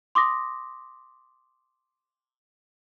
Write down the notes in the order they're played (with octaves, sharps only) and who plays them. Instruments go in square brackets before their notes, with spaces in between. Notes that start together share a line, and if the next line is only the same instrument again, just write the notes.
[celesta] C6 D6 D#6 A#6